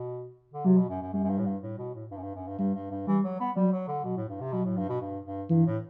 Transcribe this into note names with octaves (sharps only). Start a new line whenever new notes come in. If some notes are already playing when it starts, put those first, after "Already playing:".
Already playing: B2
D3
C3 F#3
B2
F#2
F#2
F#2 G3
F#2
G2
A2
G2
A2
B2
A2
G2
F#2
G2
F#2
G2
G2 G3
G2
G2
E3 G3
F#3
B3
F#3 G3
F#3
D3
B2 F#3
A2
G2
C3
B2 F#3
A2
G2
B2
G2
G2
G2 E3
A2